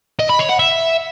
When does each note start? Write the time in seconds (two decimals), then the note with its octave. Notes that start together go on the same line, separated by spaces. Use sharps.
0.19 D#5
0.29 B5
0.39 C#5
0.49 F#5
0.59 E5